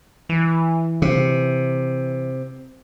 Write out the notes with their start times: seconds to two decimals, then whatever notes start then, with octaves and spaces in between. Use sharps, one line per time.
0.29 E3
1.02 C3